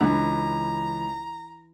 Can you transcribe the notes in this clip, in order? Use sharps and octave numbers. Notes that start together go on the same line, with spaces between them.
C#2 E3 D4 A#5